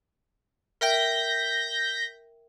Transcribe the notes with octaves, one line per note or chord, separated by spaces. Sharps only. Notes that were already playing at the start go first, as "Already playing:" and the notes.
A#4 E5 G5 G6 A#6 B6